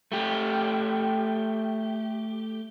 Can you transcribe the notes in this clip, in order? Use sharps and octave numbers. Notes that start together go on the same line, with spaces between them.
A3 G4